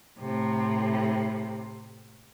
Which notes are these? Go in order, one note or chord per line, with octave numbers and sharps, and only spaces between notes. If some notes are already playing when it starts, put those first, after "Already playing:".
A2 C3